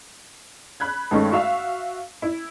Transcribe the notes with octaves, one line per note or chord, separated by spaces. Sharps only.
B5 F#6 G#6
G2 D#3 G#3 A3 C#4
F#4 E5 F5
E4